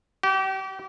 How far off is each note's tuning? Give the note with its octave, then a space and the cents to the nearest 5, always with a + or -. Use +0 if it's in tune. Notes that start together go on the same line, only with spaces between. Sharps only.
G4 -35